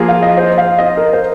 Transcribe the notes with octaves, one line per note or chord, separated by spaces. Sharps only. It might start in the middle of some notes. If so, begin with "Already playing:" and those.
Already playing: F3 A#3 F4 G#4
F5
D#5
C5
F5
D#5
A#4
C5